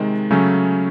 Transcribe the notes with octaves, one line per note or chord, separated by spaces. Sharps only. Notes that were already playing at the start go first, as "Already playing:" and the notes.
Already playing: C3 D#3 G#3
C#3 F#3 A3 C#4